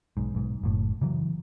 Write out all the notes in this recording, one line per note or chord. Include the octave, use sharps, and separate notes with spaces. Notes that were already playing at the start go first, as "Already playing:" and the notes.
B1 G#2
B1 G#2
F#1 A2
C#3 E3 F#3